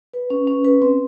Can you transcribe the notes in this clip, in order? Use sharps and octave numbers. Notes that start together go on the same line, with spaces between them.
B4
C#4
C#4
B4
C4